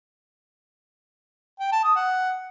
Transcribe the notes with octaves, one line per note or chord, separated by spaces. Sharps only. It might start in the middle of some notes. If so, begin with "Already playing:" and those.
G5
A5
D#6
F#5